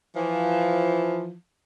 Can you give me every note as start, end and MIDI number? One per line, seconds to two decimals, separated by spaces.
0.16 1.36 52
0.16 1.36 53